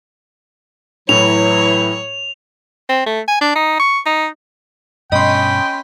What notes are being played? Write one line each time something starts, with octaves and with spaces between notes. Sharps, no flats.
A2 E3 F#3 E4 C#5 F7
C4
A3
G#5
D4
D#4
C#6
D#4
G2 B2 C#4 D#5 G5 B5 C6